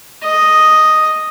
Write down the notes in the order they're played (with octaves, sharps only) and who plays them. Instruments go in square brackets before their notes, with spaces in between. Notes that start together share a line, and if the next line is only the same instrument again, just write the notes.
[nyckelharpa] D#5